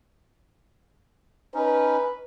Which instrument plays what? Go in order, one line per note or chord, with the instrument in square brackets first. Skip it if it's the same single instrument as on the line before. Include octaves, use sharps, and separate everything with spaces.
[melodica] C#4 D#4 [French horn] B4